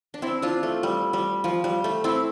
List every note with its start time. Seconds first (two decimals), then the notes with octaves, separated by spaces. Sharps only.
0.14 D4
0.22 C4 E4
0.42 D4 F4
0.63 A3
0.83 G3
1.13 G3
1.44 F3
1.64 G3
1.84 A3
2.04 C4 E4